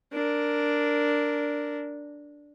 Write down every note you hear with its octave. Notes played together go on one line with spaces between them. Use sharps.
D4 A#4